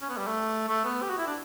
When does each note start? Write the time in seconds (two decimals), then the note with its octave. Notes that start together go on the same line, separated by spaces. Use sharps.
0.02 C#4
0.09 B3
0.17 G3
0.27 A3
0.68 A3
0.84 B3
1.02 G4
1.10 F#4
1.18 E4
1.27 D4